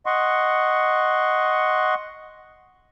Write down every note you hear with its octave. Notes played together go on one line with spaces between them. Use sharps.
D#5 F#5 C6 C#6